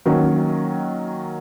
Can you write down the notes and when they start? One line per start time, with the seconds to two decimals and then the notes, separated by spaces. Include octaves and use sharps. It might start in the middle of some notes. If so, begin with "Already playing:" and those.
0.06 D#3 F#3 A#3 C#4